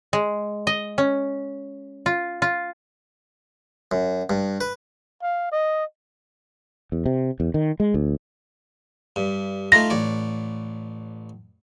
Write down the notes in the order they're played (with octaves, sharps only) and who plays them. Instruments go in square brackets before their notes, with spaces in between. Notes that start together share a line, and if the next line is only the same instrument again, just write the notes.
[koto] G#3
D#5
C#4
F4
F4
[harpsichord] F#2
G2
B4
[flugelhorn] F5
D#5
[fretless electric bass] E2
C3
E2
D#3
G#3
D2
[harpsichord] G2
[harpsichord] A3 D#4 F4 [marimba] A#6
[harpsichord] A1 C#5 D5